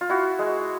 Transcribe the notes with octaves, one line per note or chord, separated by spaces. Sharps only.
F4
E4 F#4
G#3